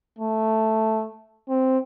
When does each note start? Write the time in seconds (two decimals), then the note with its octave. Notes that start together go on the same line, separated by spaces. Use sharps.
0.18 A3
1.49 C4